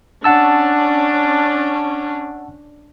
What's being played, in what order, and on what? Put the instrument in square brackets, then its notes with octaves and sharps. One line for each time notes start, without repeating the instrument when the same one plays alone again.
[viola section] C#4 D4 [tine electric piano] F#5 A5 E6